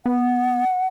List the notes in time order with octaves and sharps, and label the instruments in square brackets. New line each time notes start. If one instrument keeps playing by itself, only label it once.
[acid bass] B3 [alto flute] F#5